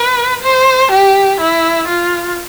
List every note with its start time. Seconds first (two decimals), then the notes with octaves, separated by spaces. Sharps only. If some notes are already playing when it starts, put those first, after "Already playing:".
Already playing: B4
0.43 C5
0.92 G4
1.41 E4
1.88 F4